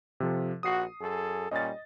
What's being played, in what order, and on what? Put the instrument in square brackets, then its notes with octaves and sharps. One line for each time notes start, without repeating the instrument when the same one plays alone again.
[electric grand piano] C3 F3 A4
[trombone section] A#1 F#4 [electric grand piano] D#6 C7
[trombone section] F#2 G#4 A4
[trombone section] A#2 G3 C#4 [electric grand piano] D#5 A6